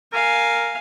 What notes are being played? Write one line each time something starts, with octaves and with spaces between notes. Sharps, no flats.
A#4 F5 G#5